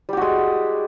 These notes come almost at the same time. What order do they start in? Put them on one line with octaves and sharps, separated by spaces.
G3 G4 F#4 G#3